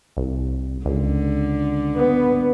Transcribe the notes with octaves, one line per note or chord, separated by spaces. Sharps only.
C2
C#2 D3
B3